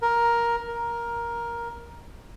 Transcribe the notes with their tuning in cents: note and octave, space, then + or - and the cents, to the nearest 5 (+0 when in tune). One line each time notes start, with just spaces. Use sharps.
A#4 +10
A#4 +10